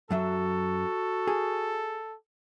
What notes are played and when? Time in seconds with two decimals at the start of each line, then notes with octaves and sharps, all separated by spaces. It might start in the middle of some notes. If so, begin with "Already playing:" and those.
0.11 F#2 F#3 F#4 A4 E5
1.27 G#4